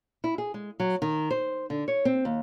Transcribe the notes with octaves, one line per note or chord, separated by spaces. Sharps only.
E4
G#4
G#3
F#3
D#3
C5
D3
C#5
C4
D#2